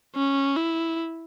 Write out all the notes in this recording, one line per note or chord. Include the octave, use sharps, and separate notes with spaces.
C#4
E4